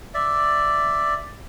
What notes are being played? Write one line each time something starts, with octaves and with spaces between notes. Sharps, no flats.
D5 E5